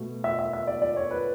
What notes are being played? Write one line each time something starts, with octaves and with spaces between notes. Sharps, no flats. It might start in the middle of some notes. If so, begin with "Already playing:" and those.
Already playing: B2 A3
E5
E5
E5
D5
D5
C#5
B4